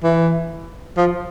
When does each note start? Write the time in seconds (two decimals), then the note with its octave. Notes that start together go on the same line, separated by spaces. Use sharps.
0.03 E3
0.97 F3